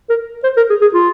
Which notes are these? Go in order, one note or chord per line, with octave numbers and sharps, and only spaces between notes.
A#4
C5
A#4
G#4
G#4
F4